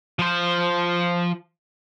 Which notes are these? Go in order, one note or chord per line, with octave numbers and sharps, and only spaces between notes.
F3 C5